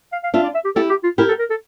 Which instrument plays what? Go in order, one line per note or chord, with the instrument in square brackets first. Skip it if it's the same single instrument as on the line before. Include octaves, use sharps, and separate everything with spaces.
[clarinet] F5
F5
[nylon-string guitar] D4 F4 [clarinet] E5
[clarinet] D5
E5
G4
[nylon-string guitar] E4 G4 [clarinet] A4
[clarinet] G4
F4
[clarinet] E4 [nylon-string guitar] G4 A#4
[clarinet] A4
A#4
A4